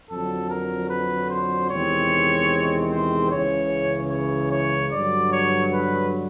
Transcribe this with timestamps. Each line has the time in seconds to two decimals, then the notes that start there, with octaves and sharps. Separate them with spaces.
0.10 F2 D3 F#3 A4
0.50 A#4
0.91 B4
1.30 C5
1.71 E2 C3 D#3 G#3 C4 C#5
2.91 C5
3.31 C#2 C#3 E3 C#5
4.12 C#5
4.52 C#5
4.92 G2 D3 F#3 D5
5.32 C#5
5.73 B4